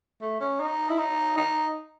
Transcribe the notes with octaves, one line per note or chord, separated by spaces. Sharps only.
A3
C#4
D#4
E4
D#4
D#4